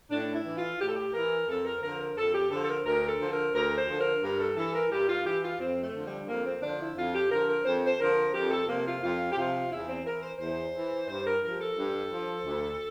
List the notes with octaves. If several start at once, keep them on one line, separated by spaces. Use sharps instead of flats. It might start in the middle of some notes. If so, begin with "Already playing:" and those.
A2 D4
E4
E3
F4
A2 G4
A4
G4
E3 A#4
F2 A4
A#4
D3 F3 A#4
A#4
F2 A4
G4
D3 F3 A4
A4
A#4
D2 A#4
A4
D3 F3
A#4
D2 A#4
C5
D3 F3 A4
A#4
G2 A#4
A4
E3 A4
A#4
G2 G4
F4
E3 G4
F4
F2 C4
A3
D3 F3
G3
F2 A#3
C4
D3 F3 D4
E4
F2 F4
G4
D3 F3 A#4
A#4
F2 C5
C5
D3 F3 A#4
F2 G4
A4
C3 F3 A#3
F4
F2 F4
G4
C3 F3 F4
E2 E4
C4
E3 A#4
C5
E2 C5
E3
G2 C5
A#4
F3 A#4
G4
A4
G2
F3
D2